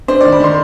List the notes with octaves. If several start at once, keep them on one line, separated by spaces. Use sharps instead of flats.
D4 C5
D5
D#3
B5
D#3 C6